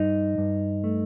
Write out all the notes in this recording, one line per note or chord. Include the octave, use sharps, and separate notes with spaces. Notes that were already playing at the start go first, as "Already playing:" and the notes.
Already playing: G2 D#4
G2
A3